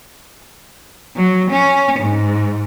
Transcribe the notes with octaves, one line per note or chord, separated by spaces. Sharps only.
F#3
C#4
G#2